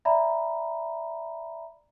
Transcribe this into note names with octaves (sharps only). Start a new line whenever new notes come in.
D5 E5 G#5 A#5 B5